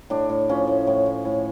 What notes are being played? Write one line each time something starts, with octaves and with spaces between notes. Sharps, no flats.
A2 D4
A2
F3 C#4
A2
A2
A2
A2